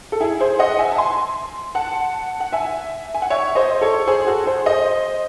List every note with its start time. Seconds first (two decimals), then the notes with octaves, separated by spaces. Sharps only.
0.12 A4
0.20 E4 G#4
0.40 G#4 C5
0.59 D#5 F#5
0.79 E5 G#5
0.92 A5
0.98 G#5 C6
1.75 F#5 A5
2.40 F#5
2.52 E5 G#5
3.14 G#5
3.22 F#5
3.30 C#5 E5
3.55 C5 D#5
3.81 A4 C#5
4.07 G#4 C5
4.26 F#4 A4
4.46 G#4 C5
4.66 C5 D#5